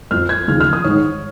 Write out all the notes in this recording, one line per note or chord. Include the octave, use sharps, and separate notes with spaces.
F2 F3 F6
G#6
D#2 C#3 F3 F6
F6
D#6
G#2 D#3 C#5